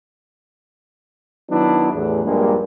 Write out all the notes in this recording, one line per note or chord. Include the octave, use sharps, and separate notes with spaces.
D#3 F#3 B3 D4 E4
A1 E2
A#1 G2 G#3 A#3